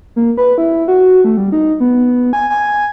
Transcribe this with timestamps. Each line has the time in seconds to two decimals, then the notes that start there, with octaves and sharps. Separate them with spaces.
0.16 A#3
0.37 B4
0.58 E4
0.88 F#4
1.24 A3
1.37 G3
1.52 D#4
1.80 B3
2.33 G#5
2.50 G#5